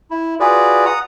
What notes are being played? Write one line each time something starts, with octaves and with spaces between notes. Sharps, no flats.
E4
F4 F#4 G#4 B4 D5
F#5 A#5 D#6